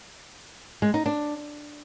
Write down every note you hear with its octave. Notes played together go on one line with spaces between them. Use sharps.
G#3
D#4
D4